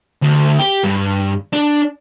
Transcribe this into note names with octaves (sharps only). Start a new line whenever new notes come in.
D2
G4
G2
D4